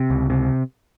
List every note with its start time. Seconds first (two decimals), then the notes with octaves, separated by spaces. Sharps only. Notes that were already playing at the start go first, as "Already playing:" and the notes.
Already playing: C3
0.10 C#2
0.30 C3